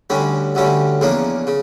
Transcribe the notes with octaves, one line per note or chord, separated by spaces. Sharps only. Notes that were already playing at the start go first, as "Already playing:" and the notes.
D2 D3 G3 C#4
D2 D3 G3 C#4
E2 C#3 F3 A#3 D4
C#3